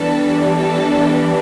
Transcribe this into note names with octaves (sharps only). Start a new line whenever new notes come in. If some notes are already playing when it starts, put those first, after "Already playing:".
Already playing: E3 G3 B3 D4 A4
A4